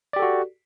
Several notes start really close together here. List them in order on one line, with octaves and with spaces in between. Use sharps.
D5 G4 A4 F#4